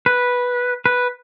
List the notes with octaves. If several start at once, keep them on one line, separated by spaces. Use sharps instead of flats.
B4
B4